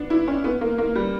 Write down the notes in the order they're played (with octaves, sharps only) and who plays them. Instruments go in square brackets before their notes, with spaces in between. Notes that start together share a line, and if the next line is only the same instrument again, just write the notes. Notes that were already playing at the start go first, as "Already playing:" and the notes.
Already playing: [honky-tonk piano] B3 D4
E4
C#4
B3
A#3
A#3
G3